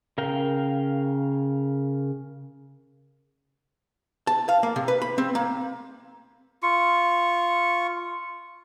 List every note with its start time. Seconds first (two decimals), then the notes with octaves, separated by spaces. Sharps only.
0.18 C#3 A#4 F5 G5
4.27 A5
4.49 F5
4.63 A#3
4.76 C3
4.88 B4
5.02 B5
5.18 C4
5.35 A#3
6.63 F4 C#6